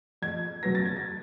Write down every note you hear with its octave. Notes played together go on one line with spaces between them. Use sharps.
F2 G#6
C#3 F#3 B3 A#6
A6
G#6
A6